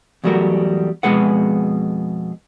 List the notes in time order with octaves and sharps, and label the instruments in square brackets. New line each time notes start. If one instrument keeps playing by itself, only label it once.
[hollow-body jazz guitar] E2 F#3 G3 A3 F#4 A#4
F2 B2 G#3 G#4 B4 F#5